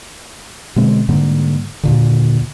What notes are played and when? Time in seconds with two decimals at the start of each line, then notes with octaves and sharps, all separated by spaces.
0.76 B2 D3 G#3 C4
1.09 G#2 D3 G3 A#3
1.83 D#2 A#2 D3